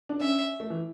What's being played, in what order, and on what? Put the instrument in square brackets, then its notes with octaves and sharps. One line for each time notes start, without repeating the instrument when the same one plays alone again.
[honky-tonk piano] D4
[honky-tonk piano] C#4 [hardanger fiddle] E5
[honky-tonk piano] A3
E3